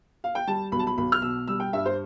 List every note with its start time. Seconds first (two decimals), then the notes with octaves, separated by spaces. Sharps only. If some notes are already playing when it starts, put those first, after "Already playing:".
0.24 F5
0.35 G5
0.47 G3 A5
0.72 B1 B5
0.79 A5
0.87 B5
0.98 B1 B5
1.12 F6
1.22 B2 E6
1.48 G3 E6
1.60 G5
1.73 G2 E5
1.86 C5